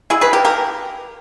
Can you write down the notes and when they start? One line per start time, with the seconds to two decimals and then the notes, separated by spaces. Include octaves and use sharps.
0.10 E4 G#4
0.21 G#4 B4
0.33 G4 A#4
0.45 G4 A#4